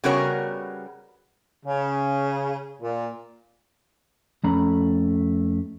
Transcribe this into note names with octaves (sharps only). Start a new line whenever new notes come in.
C#3 G3 B3 F#4 A#4 C#5
C#3
A#2
F2 A3 C#4 A#5 B5